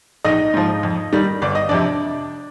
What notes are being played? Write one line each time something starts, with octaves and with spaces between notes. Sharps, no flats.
A#1 D#4 D#5
G#2 F3
F2
D#3 G3
G1 D5
D#5
F2 C3 D4 D5